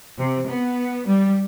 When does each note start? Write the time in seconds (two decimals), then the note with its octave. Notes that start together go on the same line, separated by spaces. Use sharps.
0.18 C3
0.48 B3
1.07 G3